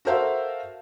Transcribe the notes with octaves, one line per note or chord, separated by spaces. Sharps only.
F#4 A4 A#4 C5 E5 F5